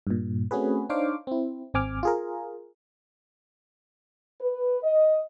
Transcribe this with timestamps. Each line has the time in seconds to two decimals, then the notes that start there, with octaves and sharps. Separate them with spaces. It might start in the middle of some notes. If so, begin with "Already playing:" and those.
0.07 G2 A#2
0.51 A3 C4 C#4 F#4 G#4 B4
0.89 D4 D#4 C5 C#5 F5 D6
1.27 C4 E4
1.74 G#1 C4 G#5 D6 F6
2.03 F4 G#4 A#4
4.40 B4
4.84 D#5